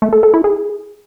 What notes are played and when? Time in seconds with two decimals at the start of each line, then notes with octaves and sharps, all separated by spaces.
0.02 A3
0.13 A4
0.23 A4
0.34 E4
0.44 G#4